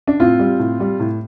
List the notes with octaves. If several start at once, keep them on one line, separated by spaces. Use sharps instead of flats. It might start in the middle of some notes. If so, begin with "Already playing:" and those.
D4
A2 C4 F4
G3
A2
G3
A2